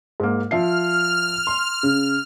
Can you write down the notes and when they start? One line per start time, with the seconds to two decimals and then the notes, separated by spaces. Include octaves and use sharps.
0.20 G#2 A#3
0.51 F3 E5 F6 C7
1.47 C6
1.83 C#3